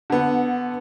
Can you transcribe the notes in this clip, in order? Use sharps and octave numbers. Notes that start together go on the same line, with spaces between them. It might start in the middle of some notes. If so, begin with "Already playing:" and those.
D3 B3